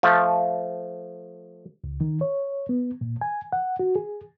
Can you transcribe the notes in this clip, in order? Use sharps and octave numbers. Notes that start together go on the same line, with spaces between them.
F3 A3
C#2
D#3
C#5
B3
A#2
G#5
F#5
F#4
G#4